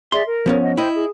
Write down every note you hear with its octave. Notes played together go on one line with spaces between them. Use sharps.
G#4 D5 E5 C6
A#4
F3 B3 C#4
D#5 F#5
E4 C5 D#5 G5
G#4